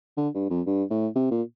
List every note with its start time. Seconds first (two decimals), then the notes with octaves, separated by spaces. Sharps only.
0.17 D3
0.34 G2
0.50 F2
0.66 G2
0.90 A2
1.15 C3
1.31 A#2